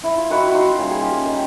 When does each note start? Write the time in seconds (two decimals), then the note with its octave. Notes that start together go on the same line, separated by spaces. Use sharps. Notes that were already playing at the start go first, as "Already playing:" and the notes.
0.04 E4
0.18 F4
0.30 D#3 E4 F#4
0.47 F#4
0.54 D#4 F4
0.78 G3 A#3 C#4
0.90 G#4
1.01 F4 G4
1.25 D#3